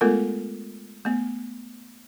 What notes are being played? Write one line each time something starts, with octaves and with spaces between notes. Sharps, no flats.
G#3 A3 B3 F4 A4 A#4
A3 B3